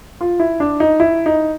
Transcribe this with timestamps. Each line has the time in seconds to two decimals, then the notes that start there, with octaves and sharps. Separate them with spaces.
0.21 F4
0.40 E4
0.60 D4
0.80 D#4
1.00 E4
1.26 D#4